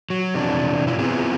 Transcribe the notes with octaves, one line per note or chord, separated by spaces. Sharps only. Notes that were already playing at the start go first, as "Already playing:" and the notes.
F#3
F2 C3 E3 D4
G2 B2 E4 F4
B3 C4 E4 F4 G#4